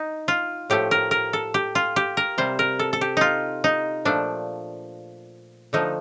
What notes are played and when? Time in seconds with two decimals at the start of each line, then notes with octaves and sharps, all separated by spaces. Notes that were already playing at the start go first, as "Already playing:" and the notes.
Already playing: D#4
0.28 F4
0.70 A2 F3 A3 G4
0.91 A#4
1.11 A#4
1.33 A4
1.54 G4
1.75 F4
1.96 G4
2.17 A#4
2.38 C3 G3 C5
2.59 A#4
2.79 A4
2.93 A4
3.01 G4
3.17 D#4 F4
3.64 D#4
4.05 A#2 F3 A3 D4
5.73 D3 F3 A3 D#4